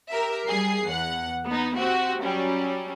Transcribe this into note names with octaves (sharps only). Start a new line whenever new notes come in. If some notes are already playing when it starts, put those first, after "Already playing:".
G4 A#4 E5
G3 G#4 C7
E2 F#5
B3 D#4
C4 F#4 G4
F#3 G3 C#4